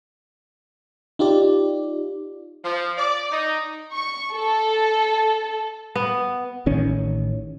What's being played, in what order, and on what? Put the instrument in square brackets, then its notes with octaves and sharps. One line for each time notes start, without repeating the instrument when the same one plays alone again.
[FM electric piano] D#4 F4 G4 D5
[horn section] F3
D5
D#4
[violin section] C#6
A4
[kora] B3
[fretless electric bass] A1 D#3 C#4